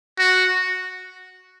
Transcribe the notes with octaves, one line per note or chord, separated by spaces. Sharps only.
F#4